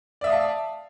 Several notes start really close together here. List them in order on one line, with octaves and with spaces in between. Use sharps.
D5 E5 D#6 F5 A5